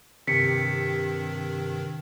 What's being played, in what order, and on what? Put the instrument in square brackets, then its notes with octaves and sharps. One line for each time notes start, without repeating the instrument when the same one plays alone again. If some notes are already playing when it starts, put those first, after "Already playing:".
[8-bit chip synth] G2 D#3 [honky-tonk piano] C3 [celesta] B6 C#7